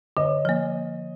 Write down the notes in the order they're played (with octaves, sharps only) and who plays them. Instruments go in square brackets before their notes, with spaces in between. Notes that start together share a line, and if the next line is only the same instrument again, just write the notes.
[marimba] D3 [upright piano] C#5 D#5
[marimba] F3 A#3